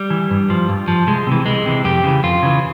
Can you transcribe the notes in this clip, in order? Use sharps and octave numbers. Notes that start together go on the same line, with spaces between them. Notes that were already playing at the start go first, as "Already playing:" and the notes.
Already playing: G3
E3
G2
F3
G2
F3
C2 G#3
C3 E3
C2 G#3
C3 E3
F2 G4
C#3 E3
F2 F4
C#3 E3